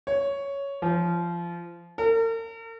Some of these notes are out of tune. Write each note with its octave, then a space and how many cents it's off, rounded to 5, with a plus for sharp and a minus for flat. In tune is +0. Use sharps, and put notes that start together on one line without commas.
C#5 +5
F3 -20
A#4 -45